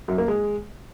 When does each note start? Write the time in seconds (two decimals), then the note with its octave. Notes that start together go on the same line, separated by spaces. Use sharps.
0.08 F#2
0.18 A#3
0.28 G#3